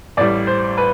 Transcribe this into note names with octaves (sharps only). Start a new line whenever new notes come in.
A1 A2 G3 D5
C5
B4